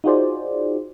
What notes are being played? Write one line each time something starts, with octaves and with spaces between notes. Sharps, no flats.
D#4 F4 F#4 G#4 C5 D5